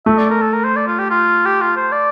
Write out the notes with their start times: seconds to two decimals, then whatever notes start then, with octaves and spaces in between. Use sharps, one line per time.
0.06 A3 E5
0.18 D5
0.30 A#4
0.42 A4
0.53 A#4
0.64 C5
0.76 D5
0.88 F4
0.99 G4
1.10 F4
1.45 G4
1.61 F4
1.77 C5
1.92 D5